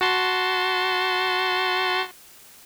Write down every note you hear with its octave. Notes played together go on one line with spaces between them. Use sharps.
F#4 A5 C6